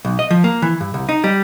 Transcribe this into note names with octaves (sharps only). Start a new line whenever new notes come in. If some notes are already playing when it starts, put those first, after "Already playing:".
B1
D#5
F3
A#3
E3
G2
C2
D#4
G3